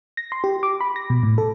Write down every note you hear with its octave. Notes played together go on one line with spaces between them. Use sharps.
A#6
C6
G4
D6
B5
A#6
B2
A2
A4